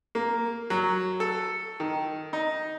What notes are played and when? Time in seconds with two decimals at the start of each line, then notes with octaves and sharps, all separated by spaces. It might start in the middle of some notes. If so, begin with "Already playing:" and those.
0.15 A#3
0.70 F#3
1.20 A4
1.80 D#3
2.33 D#4